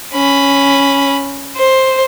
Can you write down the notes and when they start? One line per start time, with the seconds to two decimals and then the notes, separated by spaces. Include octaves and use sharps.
0.13 C#4 B5
1.56 C5